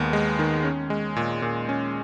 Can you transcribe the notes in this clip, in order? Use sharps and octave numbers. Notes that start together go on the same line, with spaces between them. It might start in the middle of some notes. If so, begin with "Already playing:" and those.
Already playing: D#2 D#3 G#3 B3
G#3
D#3
C#4
G#3
A#2
A#2
C#4